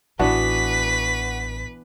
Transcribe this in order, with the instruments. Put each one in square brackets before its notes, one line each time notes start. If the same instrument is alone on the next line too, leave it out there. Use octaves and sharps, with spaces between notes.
[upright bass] A1 [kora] E3 B3 D4 [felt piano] F#4 [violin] B4 B6